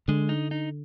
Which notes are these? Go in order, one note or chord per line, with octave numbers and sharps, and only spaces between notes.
D3 G#3
D#4
D#4